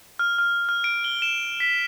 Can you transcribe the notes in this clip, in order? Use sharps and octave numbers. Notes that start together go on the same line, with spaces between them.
F6
F6
F6
D7
G7
E7
B6